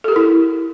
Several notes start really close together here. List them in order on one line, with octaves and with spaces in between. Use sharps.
A4 G4 A#4 E4